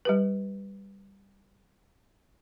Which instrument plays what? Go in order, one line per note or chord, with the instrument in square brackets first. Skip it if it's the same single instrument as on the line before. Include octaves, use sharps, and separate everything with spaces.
[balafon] G3 G4 B4